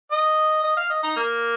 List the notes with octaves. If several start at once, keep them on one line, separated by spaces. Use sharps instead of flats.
D#5
D#5
F5
D#5
D#4
A#3